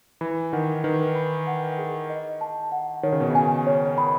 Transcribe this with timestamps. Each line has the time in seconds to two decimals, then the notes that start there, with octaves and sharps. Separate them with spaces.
0.21 E3 B5
0.53 D#3 F#5
0.84 D#3 B4
1.15 B5
1.47 F#5
1.78 G#4
2.09 D#5
2.41 A5
2.72 F#5
3.03 D#3 C#5
3.12 C#3
3.20 B2
3.30 C#3
3.35 G#5
3.67 C#5
3.98 B5